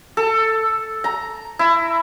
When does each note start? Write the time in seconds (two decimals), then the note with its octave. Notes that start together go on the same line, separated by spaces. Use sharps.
0.17 A4
1.04 A#5
1.59 E4